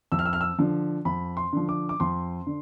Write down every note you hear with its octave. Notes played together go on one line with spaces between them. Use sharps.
F2 E6
F6
E6
F6
E6
D3 F3
F2 B5
C6
D3 F3
D6
D6
F2 C6
D3